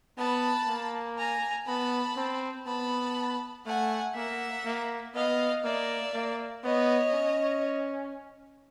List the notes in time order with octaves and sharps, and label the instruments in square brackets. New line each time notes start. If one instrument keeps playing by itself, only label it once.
[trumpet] B3 [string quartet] A5 B5
[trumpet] A#3
[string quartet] G#5 A#5
[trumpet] B3 [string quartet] A5 B5
[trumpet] C4
[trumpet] B3 [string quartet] A5 B5
[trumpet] A3 [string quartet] F#5 G#5
[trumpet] A#3 [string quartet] E5 F#5
[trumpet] A#3
[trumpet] B3 [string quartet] D#5 F5
[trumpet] A#3 [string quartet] D5 E5
[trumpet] A#3
[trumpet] B3 [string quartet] C#5 D#5
[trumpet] C#4